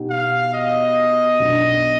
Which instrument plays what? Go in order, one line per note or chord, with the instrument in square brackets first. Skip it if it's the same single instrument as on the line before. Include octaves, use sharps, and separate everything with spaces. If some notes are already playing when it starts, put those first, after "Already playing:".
Already playing: [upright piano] B2 B3 D#4 G4
[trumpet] F5
D#5
[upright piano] B1 B2 B3 D4